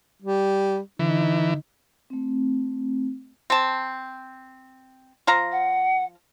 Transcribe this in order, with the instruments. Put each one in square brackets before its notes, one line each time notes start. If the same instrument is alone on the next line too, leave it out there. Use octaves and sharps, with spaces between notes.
[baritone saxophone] G3
[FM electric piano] D3 [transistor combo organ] E3 [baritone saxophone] D#4
[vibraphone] A3 C4
[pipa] C4 A5
F3 F5 A#5
[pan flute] F#5